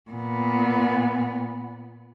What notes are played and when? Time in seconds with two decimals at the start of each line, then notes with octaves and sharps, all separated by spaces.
0.11 A#2 B3